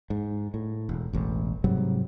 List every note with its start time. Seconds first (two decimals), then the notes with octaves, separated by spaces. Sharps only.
0.10 G#2
0.54 A2
0.89 E1
1.13 E1 A1
1.64 G#2 C3 F#3 G3